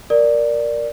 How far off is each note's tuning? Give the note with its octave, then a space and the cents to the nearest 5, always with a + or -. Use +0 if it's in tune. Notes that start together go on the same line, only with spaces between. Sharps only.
A#4 +0 D5 +0